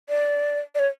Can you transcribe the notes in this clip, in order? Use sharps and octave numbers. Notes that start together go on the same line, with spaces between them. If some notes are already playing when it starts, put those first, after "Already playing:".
D5
D5
C#5